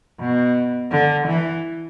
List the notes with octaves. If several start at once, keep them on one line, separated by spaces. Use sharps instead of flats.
B2
D3
E3